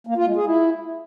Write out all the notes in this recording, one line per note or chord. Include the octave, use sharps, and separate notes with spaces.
A#3
F4
G#3
G#4
E4